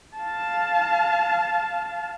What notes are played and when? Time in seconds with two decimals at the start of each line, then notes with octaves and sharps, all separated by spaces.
0.17 F5 A5